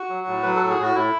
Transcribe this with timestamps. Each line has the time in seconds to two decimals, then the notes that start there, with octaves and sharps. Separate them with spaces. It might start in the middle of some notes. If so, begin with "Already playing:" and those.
Already playing: F#4
0.09 F#3
0.27 A2
0.43 F#3 B4
0.56 A2 A4
0.70 G#4
0.78 A2 F#4
0.95 A2 E4